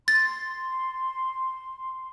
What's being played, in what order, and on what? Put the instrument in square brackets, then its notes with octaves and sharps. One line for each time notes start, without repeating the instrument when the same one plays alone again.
[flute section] C6 [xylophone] A6